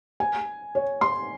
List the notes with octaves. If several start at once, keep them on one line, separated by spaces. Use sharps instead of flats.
G#5
C#5
C6